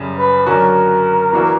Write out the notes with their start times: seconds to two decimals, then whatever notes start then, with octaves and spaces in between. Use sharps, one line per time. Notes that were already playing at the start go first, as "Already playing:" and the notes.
Already playing: F#2 C#3 G3
0.17 B4
0.46 D3 F#3 C#4 F#4 A#4
1.33 E3 A#3 D4 F#4